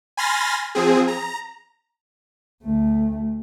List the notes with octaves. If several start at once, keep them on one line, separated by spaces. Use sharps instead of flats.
G#5 B5 C6 F6 A6 A#6
F3 C4 G#4
A#5
D2 A3